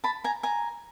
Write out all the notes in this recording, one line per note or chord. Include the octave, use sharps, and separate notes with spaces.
A5 B5
G#5 A#5
G#5 A#5